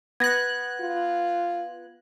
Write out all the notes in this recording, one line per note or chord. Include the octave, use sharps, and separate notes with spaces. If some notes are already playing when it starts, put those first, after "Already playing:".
B3 F#6 G#6 A#6
F4